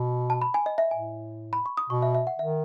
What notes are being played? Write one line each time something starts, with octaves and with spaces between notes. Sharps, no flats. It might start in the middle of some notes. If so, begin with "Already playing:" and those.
Already playing: B2
A5
B5
G#5
D#5
E5
A2 G#5
B5
C#6
D#6
B2 C#6
E5
E5
F#5
D#3 E5